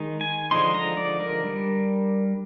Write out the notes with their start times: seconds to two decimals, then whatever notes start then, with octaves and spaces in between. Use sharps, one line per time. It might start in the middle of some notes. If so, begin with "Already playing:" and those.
Already playing: D#3 G#3 D#4
0.21 G#5
0.51 D3 F3 G#3 D#4 C6
0.74 A#5
0.97 D5
1.20 A#4
1.43 G3 D4